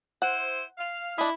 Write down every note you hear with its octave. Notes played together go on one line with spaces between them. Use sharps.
E4 C5 F#5
F5
D4 E4 D#5